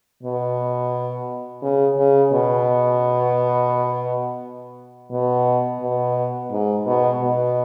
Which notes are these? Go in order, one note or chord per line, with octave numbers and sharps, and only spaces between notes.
B2
C#3
C#3
B2
B2
B2
G#2
B2
B2